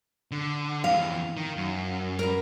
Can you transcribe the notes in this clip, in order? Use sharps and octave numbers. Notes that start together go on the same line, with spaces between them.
D3
F2 E3 F5
D#3
F#2
A#4 B4